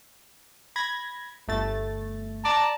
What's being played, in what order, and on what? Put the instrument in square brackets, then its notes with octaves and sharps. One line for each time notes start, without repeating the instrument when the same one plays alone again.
[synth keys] B5 G#6 A#6
G1 A3 A6
[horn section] D5 A5 A#5